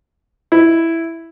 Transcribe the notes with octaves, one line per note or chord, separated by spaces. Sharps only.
E4